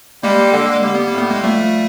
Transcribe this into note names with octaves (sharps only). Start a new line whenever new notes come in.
G3 G#3 A#3
D3
G3 A#3
B3
A#3
A2
B3
G#3 A#3
F3 G3 A3